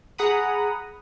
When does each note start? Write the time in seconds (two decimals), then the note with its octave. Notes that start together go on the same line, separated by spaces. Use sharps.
0.18 G#4 F#5 A#5 B5 D#6